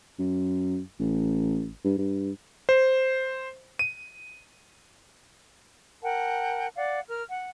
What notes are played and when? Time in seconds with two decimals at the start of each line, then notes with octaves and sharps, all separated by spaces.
0.19 F#2
0.99 A1
1.84 G2
1.98 G2
2.69 C5
3.79 D#7
6.02 A#4 F#5 G5 A5
6.75 D5 F5 F#5
7.08 A#4 F6
7.29 F#5